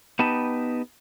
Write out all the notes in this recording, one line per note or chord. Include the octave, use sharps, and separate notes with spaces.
B3 D#4 G4 B4 A5